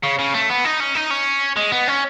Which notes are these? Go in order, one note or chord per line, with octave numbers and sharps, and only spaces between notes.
C#3
C#3
A3
B3
D#4
C#4
D#4
C#4
G#3
B3
C#4